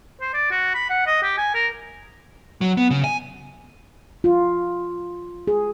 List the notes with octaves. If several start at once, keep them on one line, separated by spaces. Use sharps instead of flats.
C5
D5
F#4
B5
F#5
D#5
G4
G#5
A#4
F#3
B3
C#3
G#5
F4
G#4